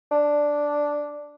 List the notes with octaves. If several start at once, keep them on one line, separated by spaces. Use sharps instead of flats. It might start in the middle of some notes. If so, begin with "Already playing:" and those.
D4